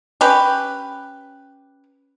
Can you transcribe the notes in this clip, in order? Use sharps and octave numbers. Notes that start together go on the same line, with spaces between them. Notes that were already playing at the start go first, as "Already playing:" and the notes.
C#4 G4 B4